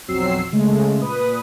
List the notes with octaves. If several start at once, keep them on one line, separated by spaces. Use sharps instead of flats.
B1 F2 F#3 C4 E6 C7
C#3 G#3 A3
A#2 B4 D#6